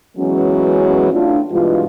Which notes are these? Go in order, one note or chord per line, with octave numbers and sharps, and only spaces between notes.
E3 F#3 G#3 B3 C#4
A2 D4 F4
G2 B2 E3 G#3 F4